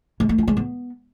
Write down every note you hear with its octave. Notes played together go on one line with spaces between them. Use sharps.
G#3
A3
F4
G#3
B3